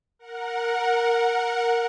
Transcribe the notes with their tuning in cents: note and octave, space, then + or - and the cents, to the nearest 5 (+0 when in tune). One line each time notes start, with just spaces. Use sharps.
A#4 +0 F#5 -15